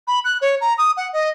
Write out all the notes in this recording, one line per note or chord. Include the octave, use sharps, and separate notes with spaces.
B5
F#6
C#5
A#5
D#6
F#5
D#5